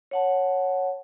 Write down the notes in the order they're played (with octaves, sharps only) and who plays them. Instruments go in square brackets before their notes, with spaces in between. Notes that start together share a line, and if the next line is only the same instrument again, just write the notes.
[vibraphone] C#5 F#5 A5